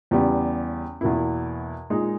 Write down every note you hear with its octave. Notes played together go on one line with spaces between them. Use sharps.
E2 C#3 G3 B3 G4
E2 B2 A#3 E4
A#2 G#3 D#4